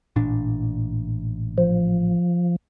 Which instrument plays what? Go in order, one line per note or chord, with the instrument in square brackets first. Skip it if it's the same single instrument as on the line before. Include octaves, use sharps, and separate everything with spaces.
[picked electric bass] A1 A#2 D4
[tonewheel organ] F3